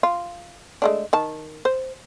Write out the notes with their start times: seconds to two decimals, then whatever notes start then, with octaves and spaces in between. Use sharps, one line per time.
0.03 F4
0.82 G#3 A3 D4
1.13 D#3 A5
1.65 C5